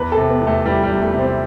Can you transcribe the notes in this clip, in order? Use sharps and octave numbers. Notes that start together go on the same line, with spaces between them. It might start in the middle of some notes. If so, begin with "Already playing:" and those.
Already playing: E2 B4
A4
C3
B3
E2
A3
E3 G3
G3
E2
A3
C3
C4